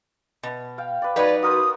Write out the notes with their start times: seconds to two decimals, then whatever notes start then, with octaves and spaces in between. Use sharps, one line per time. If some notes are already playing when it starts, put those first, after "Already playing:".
0.43 B2
0.78 F5 G5
1.02 B4 D5
1.16 F#3 D#4 F#4 B4 D5
1.43 F#4 A#4 C5 D#6